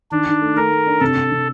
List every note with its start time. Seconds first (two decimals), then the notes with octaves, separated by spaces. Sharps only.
0.11 D#3 D4
0.26 D#3
0.41 A3
0.56 A3 A#4
0.71 A3
0.86 D4
1.01 C3 A4
1.16 C3
1.32 C3